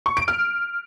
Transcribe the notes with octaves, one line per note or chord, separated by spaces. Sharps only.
C#6
D7
F6